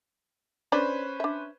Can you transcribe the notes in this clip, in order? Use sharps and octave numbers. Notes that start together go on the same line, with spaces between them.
C#4 D4 B4 C5 D5 B5
D4 E5